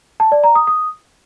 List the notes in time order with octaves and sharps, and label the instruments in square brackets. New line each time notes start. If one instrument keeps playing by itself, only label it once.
[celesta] A5
D5
A#5
D#6
D#6